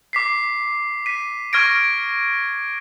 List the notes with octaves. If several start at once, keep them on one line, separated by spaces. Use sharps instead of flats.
D6 B6 C7
B6 D#7
C#6 F6 G#6 A#6 D7